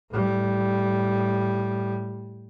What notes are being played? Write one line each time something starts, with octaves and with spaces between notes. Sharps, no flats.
A2 G3